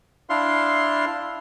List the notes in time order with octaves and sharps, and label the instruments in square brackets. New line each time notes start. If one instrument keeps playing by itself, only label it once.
[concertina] D4 E4 F5 C6